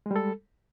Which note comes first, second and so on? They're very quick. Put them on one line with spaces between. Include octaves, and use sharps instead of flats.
G#3 G3 A4